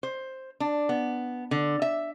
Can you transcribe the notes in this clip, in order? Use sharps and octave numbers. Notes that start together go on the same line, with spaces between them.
C5
D4
B3
D3
E5